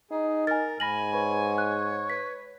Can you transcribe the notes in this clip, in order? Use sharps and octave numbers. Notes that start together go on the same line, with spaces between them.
D#4 G#4
A#4 G#5 A6
G#2 G#5 B5 A#6 F#7
B4 C#5 B5
F#6
B4 B6